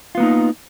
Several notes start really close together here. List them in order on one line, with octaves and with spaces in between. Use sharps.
F4 B3 A#3 D#4